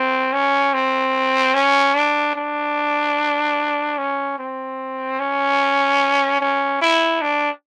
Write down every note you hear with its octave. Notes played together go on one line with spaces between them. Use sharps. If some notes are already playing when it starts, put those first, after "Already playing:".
Already playing: C4
C#4
C4
C#4
D4
D4
C#4
C4
C#4
C#4
E4
D4